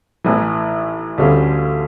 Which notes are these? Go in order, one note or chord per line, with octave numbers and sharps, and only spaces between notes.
A1 A2 E3
D2 D3 G3 C#4 F4